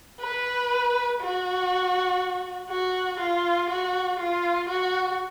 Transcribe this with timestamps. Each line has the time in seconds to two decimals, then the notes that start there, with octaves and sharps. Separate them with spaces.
0.20 B4
1.21 F#4
2.69 F#4
3.19 F4
3.70 F#4
4.19 F4
4.69 F#4